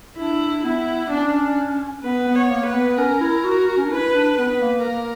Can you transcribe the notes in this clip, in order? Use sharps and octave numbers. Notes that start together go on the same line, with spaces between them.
D4 E4
B3 E4
C#4 D4
B3 B4
B3
C#5
A#3
B4
B3
C#4 A#4
E4
F#4
F#4
C#4
D4
E4 B4
D4
B3 B4
A#3
A#3 A#4